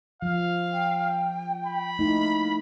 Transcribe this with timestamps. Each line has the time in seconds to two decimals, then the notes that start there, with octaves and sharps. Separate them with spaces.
0.22 F3 F5
0.72 G5
1.66 B5
1.99 A3 A#3 D#4 E4